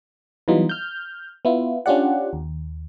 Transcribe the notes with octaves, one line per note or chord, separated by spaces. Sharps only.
E3 F#3 G3 B3 D#4 F4
F6 G6
B3 E4 F4
C#4 D4 F4 G4 D5 F#5
D#2